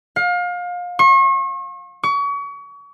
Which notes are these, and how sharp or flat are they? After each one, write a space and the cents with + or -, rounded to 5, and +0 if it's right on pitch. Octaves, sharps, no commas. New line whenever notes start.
F5 +30
C#6 -40
C#6 +35